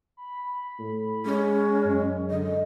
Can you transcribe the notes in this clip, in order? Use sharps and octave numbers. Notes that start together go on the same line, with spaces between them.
B5
A2
G#3 C#4
F#2
D3 D#5